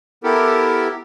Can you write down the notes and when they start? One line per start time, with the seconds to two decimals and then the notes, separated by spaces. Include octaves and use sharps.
0.24 B3 E4 G4 A4 A#4